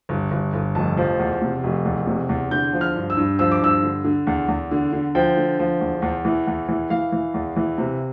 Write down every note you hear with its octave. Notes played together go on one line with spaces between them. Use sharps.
G1
G1
G1
F1 A5
F3
E2
C3
F1
E2
C3
E2
D3 G6
F3
F6
G2
E6
G2
F3 E6
D6
G2 E6
D3
D3
E2
E2
D3
D3
F3 G5
D3
F3
E2
E2
E3
E2
E3
E3 F5
E3
E2
E3
C3